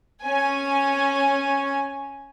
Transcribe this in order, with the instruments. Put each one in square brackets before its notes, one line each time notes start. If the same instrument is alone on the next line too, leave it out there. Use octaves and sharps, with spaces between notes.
[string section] C#4 G#5